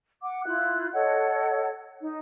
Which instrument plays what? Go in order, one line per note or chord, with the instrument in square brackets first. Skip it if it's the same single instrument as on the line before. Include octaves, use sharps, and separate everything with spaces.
[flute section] F#5 D6
E4 F4 F#6
A4 C#5 D#5 F#5
D#4